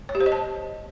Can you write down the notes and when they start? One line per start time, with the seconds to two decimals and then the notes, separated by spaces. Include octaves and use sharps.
0.09 C#5
0.15 G4
0.20 C5
0.26 D#5
0.32 A5